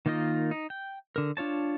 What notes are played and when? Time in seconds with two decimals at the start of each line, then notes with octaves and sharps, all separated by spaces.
0.06 D#3 A#3 D#4 F4 D#5
0.51 D#4
0.70 G5
1.16 D3 A#4
1.37 D4 F4 C#5 A5